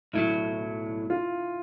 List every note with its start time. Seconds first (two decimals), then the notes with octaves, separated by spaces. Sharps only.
0.13 B1 A2 F#3 E4
1.10 F4